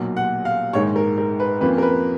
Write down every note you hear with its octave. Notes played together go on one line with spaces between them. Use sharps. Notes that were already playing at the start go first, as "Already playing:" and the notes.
Already playing: B1 A#2 F#3
F#5
F5
A#1 G#2 D#3 G#3 C#5
A#4
A#4
B4
F2 F3 A#3 C#4 B4
A#4
B4